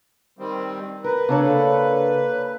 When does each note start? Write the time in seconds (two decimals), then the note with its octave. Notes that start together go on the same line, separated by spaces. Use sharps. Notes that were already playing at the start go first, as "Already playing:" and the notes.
0.39 D#3 G3 C4
1.04 A#4 B4
1.29 C#3 A#3 D4 A4 C#5